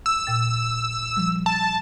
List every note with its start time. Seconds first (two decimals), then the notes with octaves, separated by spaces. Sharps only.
0.06 E6
0.27 A#2 G5 A6
1.17 F3 G3
1.46 A5